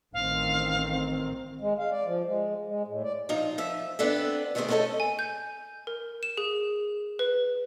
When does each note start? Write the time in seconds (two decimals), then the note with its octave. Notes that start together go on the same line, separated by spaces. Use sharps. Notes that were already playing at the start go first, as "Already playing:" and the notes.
0.14 A1 D#3 C4 F5
1.61 G#3
1.79 F5
1.92 D5
2.06 F3
2.27 G#3
2.67 G#3
2.87 A2
3.04 D5
3.29 A#2 F3 D#4 F4
3.58 F3 E5
3.99 B3 C4 D4 A4 E5
4.55 D#3 A3 B3 C4 G#4 C5
4.68 A3 B3 C#4 D#4 A4 D#5
5.00 G#5
5.19 G6
5.87 A#4
6.23 E7
6.38 G#4
7.19 B4